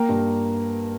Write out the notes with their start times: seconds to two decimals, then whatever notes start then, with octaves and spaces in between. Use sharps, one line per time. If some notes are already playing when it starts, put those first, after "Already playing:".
Already playing: A#3 G5 A#5
0.09 G2